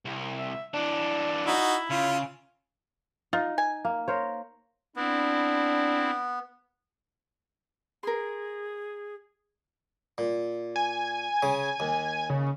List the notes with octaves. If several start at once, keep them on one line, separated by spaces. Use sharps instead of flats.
C2
E5
E3 D4 D5
D#4 E4 F#4
C#3 F4
D#4 F4
G#5
A#3
A#4 C5 C#5
B3 C4 D4 E4
G#4 A#4 C6
A#2
G#5
C#3
D#2
C#3